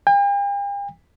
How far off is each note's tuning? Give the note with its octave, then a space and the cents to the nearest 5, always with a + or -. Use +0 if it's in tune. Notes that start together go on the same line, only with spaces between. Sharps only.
G5 +45